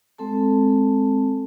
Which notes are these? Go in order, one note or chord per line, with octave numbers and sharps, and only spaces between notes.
G#3 C4 A4 A5